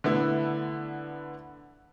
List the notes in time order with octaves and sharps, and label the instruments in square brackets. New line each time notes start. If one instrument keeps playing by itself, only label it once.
[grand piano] D3 A3 B3 E4